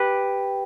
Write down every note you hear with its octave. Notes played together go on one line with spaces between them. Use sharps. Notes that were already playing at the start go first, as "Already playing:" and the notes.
Already playing: G4 B4